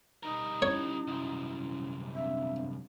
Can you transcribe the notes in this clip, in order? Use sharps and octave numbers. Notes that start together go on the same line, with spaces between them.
G3 D#4 A#4
C#4 E4 C#5
C2 F#2
C4 D4 E5 F5